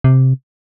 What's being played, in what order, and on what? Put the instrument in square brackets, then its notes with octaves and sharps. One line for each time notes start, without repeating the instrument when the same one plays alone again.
[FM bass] C3